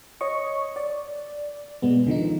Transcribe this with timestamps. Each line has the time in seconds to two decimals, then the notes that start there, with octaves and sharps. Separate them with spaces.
0.21 C#5 D#5 C#6
0.76 D5
1.82 B2 G#3 B3
2.07 D3 D#3 F3 D#4